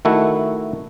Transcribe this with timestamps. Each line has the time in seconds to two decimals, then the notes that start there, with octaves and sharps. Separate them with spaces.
0.05 D#3 A3 E4 F#4